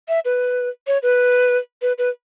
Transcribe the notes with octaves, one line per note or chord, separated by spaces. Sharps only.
E5
B4
C#5
B4
B4
B4